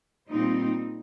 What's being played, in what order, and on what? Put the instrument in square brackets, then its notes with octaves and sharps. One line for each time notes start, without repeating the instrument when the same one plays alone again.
[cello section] A#2 G3 C4 D#4